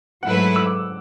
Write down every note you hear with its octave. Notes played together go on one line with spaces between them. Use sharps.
G#2 F#3 A3 E4 B4 F#5
E6
D6